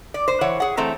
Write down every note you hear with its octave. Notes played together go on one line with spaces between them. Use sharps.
D5
C5
E3 C#5 F#5
G#4 F#5
E3 A3 C4 A#5